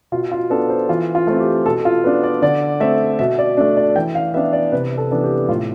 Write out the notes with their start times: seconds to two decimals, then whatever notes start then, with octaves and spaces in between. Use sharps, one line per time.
0.12 B2 F4
0.32 F4
0.50 B3 D4 A4
0.70 C5
0.89 E3 F4
1.15 F4
1.27 A3 C4
1.40 G4
1.66 B2 A4
1.85 F4
2.04 B3 D4
2.23 D5
2.42 D3 D5
2.80 A3 C4 E5
3.19 B2 E5
3.39 D5
3.57 A3 D4
3.77 D5
3.96 E3 G5
4.15 F5
4.34 B3 D4 E5
4.53 D5
4.72 C3 B4
4.98 A4
5.11 E3 B3 D4
5.24 G4
5.49 A2 F4